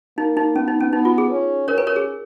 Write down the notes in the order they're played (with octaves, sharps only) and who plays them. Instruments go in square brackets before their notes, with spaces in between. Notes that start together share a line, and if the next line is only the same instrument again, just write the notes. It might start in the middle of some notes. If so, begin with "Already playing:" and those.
[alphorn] A#3 [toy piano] D#4
[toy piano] D#4
[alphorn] B3 [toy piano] C#4
[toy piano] D#4
C#4
[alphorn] B3 [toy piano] D#4
[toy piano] F4
G#4
[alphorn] C#4
[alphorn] C#4 [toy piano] A#4 C#5
[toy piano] B4
A#4 C#5
G#4